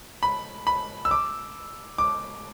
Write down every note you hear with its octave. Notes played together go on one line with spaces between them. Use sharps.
B5
B5
E6
D6
D6